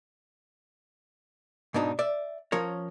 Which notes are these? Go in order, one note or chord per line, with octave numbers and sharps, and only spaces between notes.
G#2 B2 D4 D#4
D5 E5
F3 C#4 A#4 C#5